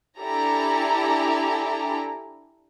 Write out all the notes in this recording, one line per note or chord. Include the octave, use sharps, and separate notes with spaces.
D4 E4 G4 A4 G#5 A#5